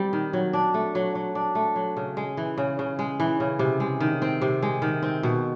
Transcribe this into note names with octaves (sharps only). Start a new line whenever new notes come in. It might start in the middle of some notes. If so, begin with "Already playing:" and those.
Already playing: G3 C4
D#3
F#3
D4
A3
F#3
F#3
D4
A3
F#3
C#3
G#3
E3
C#3
C#3
G#3
E3
C#3
C3
G#3
D#3
C4
C3
G#3
D#3
C4
B2